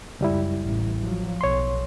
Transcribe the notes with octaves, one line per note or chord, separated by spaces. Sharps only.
C#2 F#2 G3 E4
A1
F3 F#3
B1 C#5 C6